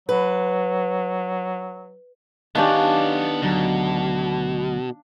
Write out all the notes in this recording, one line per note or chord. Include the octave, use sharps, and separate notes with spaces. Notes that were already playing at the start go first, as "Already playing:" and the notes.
F#3 B4
D#3 B3 C#4 D4 G4 D5 F5 A5
D2 B2 F#3